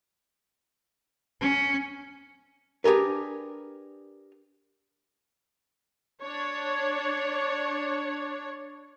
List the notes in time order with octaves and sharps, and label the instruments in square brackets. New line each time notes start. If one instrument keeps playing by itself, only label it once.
[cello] C#4
[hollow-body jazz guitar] D4 G4 G#4 A#4 B4
[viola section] D4 C#5